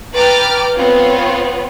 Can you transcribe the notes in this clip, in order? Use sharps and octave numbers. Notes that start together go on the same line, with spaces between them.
B4 G5 A#5 D6 F6 A6
B3 C4 F4 C#5